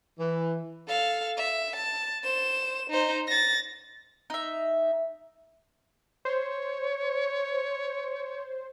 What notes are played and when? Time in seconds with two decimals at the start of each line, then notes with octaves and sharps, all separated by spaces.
0.19 E3
0.88 A4 F5
1.37 E5
1.76 A5
2.23 C5 E7
2.90 D#4 C5
3.27 A6 A#6
4.30 D#4 E5
6.25 C5 C#5